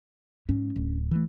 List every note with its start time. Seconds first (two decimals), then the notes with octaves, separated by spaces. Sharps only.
0.49 G#2 C#4
0.76 D1
1.11 E3 A3